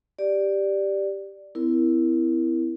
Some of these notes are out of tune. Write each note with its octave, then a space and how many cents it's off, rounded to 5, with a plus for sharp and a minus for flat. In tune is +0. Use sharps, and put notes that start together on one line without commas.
G4 +0 D5 +0
C4 -40 E4 +0 A#4 +0